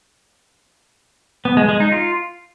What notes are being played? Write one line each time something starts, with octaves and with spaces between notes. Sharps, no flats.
B3
G#3
G#3
D#4
F4